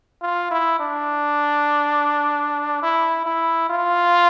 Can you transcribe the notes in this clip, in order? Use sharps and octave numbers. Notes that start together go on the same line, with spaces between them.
F4
E4
D4
E4
E4
F4